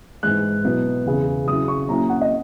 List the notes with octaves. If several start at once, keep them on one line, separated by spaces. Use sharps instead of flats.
G#2 E3 G#3 F#6
B2 F#3 B3 E4
E2 C#3 E3
C#3 F#3 C#4 E4 D#6
C#6
A#2 F#3 C#4 E4 A#5
F#5
D#5